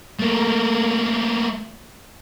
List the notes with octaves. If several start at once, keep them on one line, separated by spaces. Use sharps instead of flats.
A3 A#3